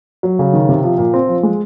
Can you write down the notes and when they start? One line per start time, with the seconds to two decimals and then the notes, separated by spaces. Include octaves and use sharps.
0.23 F#3
0.39 C#3
0.54 D#3
0.69 C3
0.83 F3
0.98 A#2
1.14 C4
1.28 F3
1.43 G#3